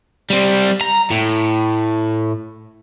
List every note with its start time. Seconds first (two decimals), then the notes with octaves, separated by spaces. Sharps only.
0.30 G3 C4
0.81 A#5
1.11 A2